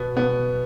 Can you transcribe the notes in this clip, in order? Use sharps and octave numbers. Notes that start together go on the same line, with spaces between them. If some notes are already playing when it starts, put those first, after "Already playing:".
Already playing: B2 B3
B2 B3